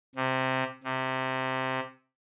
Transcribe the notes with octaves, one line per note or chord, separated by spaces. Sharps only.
C3
C3